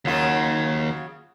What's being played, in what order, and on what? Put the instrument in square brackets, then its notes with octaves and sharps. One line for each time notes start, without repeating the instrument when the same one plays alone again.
[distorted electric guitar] D#2 [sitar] C#3 F#3 F4